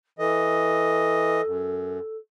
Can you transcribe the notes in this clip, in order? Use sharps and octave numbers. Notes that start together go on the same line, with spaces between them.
E3 A4 D#5
F#2